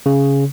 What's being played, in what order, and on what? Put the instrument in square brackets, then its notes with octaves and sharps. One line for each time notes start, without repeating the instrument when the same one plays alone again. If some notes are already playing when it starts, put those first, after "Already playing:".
[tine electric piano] C#3